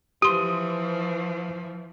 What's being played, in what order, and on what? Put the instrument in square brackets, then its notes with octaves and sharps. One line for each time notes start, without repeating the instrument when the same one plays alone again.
[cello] E3 F3 [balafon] G4 C6 [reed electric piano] D#6